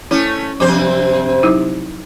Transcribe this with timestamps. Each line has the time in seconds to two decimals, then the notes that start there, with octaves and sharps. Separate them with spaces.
0.11 A3 C#4 E4
0.60 F#2 C3 F3 C4 C5
1.43 F#3 D#4 E4